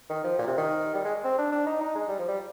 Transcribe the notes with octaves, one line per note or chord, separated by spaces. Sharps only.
D#3
F3
A#2
C3
D#3
G3
G#3
C4
D4
D4
D#4
D#4
G#3
G3
F3
G3